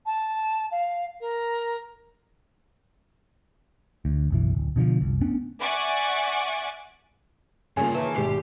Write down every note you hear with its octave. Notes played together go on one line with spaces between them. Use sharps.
A5
F5
A#4
D2
F#1 B1 E3
D1
B2 D3 E3 F3
F#1 C2
A3 B3 C#4 D4
D5 E5 F#5 G#5 C#6 D6
G2 C#3 A#3 F4 G#5
D#3 E3 A5
G#1 B2 G#3 G4 C7